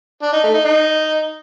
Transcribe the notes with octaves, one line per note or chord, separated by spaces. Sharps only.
D4
D#4
A3
D#4
D#4